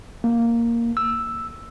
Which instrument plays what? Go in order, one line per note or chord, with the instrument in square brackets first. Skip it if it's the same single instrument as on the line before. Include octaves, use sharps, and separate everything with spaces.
[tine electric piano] A#3
E6